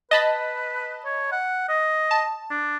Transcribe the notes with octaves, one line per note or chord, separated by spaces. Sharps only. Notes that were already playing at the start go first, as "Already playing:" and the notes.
B4 D#5 A5 B5
C#5
F#5
D#5
A5
D4